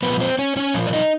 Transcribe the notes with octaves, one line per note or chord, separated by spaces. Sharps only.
A#2 F3 B3 B4
C4 C5
C#4 C#5
C#4 C#5
A#2 F3
D5
D#4 D#5